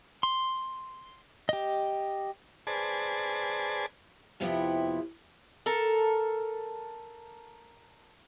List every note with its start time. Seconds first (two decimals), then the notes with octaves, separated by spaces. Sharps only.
0.23 C6
1.49 G4 D#5
2.67 G#4 B4 C5 D5 G#5 A5
4.40 F2 C3 F3 B3 E4 G4
5.66 A4 A#4